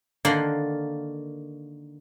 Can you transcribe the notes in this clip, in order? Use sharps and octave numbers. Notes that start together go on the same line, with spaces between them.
D3 D#3 A#3 D5 F#5 C6